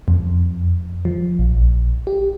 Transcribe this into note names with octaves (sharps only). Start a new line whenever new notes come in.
F2
F3
A#1
G4